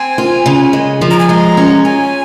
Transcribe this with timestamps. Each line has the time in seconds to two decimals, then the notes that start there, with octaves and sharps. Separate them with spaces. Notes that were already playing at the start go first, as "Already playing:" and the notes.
Already playing: C4 G#5
0.18 F4
0.46 C#3
0.73 G#3
1.01 F3
1.11 A#5
1.19 G#5
1.29 G#3 A#5
1.57 C#4
1.84 F4 G#5